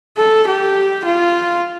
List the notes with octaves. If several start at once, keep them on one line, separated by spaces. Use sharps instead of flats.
A4
G4
F4